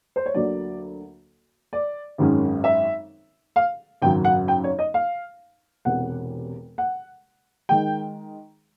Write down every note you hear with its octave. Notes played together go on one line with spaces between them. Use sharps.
C5
C#5
D2 D3 F#3 A#3 D5
D5
G#1 F#2 D#3 G#3 C#4
E5
F5
G#1 F#2 C#3 F#3 G5
F#5
G5
C#5
D#5
F5
E1 E2 C3 F#5
F#5
D#3 G#3 G5